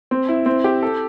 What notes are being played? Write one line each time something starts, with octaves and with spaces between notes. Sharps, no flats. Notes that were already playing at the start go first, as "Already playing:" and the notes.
C4
E4
C4
G4
A4